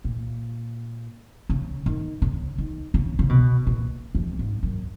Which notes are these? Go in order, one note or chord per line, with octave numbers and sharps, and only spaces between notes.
A#2
C#3
D#3
C#3
D#3
C#3
C#3
B2
A#2
F2
G#2
F#2